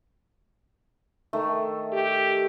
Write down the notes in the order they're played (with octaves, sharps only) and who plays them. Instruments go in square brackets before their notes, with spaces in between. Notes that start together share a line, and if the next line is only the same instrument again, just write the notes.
[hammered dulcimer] D#3 A3
[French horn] G4